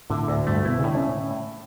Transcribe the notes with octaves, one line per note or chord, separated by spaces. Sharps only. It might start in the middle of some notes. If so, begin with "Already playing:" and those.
A2 D3
D2
G2 A3
B2 E4
C#3
A2 D3
C#4